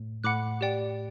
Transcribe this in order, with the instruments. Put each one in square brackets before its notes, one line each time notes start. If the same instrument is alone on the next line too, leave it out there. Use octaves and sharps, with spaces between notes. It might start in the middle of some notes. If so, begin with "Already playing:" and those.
Already playing: [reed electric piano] A2
[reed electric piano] A2 [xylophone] F#5 B5 D6 F#6
[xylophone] G4 D5 G5